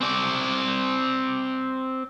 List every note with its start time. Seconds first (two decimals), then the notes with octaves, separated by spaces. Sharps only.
0.01 C4 D5